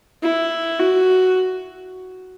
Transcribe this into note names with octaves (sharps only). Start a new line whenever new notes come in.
E4
F#4